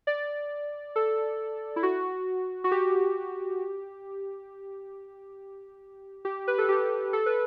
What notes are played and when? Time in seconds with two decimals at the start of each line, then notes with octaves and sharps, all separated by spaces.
0.07 D5
0.96 A4
1.76 E4
1.83 F#4
2.64 F#4
2.71 G4
6.25 G4
6.48 B4
6.58 A4
6.69 G4
7.13 A4
7.26 B4